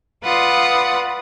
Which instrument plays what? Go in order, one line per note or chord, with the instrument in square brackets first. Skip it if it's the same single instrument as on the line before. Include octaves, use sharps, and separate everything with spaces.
[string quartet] F4 B4 D5 F#5 D#6